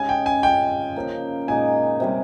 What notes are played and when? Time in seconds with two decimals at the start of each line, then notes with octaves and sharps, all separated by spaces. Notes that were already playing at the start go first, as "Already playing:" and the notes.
Already playing: C#3 G#3 C#4 D#4 G4 G#5
0.09 G5
0.26 G#5
0.43 C#3 G#3 C#4 F4 G5
0.96 C#3 F3 A#3
1.48 A#2 G#3 D#4 G#4 G#5
2.00 C3 G3 C#4